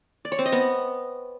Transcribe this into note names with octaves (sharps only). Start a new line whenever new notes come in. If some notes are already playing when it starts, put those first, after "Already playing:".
D5
C#5
C4
D#5
B3